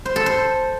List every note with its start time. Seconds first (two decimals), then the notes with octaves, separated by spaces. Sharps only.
0.06 C5
0.16 A4
0.26 C5